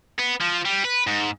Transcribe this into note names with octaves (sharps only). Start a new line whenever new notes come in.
B3
F3
G3
B4
G#2